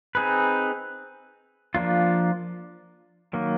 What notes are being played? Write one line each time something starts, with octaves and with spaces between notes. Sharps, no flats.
C4 D#4 G#4 B4
F3 A#3 D4 F4
D#3 F#3 A#3